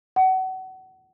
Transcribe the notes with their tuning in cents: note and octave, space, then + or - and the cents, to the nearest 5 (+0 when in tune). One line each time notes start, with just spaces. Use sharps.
F#5 +30